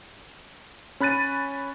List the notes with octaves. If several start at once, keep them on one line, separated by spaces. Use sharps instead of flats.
C#4 B5 F#6 A6 D#7